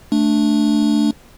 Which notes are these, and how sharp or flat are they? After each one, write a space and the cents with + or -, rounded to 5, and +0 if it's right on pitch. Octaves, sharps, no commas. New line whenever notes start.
A3 +0 D4 +0